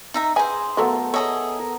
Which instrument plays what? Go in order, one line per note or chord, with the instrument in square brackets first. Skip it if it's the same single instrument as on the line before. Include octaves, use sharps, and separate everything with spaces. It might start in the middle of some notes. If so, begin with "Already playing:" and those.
[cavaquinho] D#4 E5 A#5
[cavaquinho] G#4 C5 [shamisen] B4 G#5
[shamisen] F#3 A3 F4 [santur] B3 A4 A#4
[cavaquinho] G#4 D#5 E5 [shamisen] C#5 A5
[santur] A#4